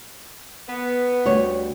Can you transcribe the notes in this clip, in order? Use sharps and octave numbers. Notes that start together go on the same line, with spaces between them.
B3
D2 G3 C#5